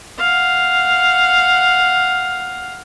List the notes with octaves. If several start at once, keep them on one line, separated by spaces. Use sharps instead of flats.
F5 F#5